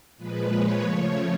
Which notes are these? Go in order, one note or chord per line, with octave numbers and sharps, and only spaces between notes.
A#2 F3 G#3 B4
C#5
C#3 F3 A3